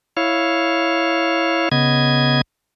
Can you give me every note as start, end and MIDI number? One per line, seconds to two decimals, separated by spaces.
0.17 1.69 64
0.17 1.69 73
0.17 1.69 77
1.72 2.41 49
1.72 2.41 59
1.72 2.41 75
1.72 2.41 92